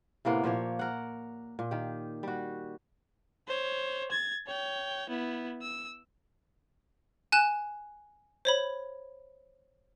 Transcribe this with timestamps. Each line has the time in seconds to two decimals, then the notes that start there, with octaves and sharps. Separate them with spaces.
0.25 A2 C3 A#3 B3
0.44 A#2 F3 A#3 C#5
0.79 A#4 F#5
1.59 A#2
1.71 D#3 G4
2.23 G3 F#4
3.47 C5 C#5
4.11 G#6 A6
4.47 C#5 G5
5.09 B3 E4
5.62 E6
7.32 G#5 F#6 E7
8.45 C5 C#5 B5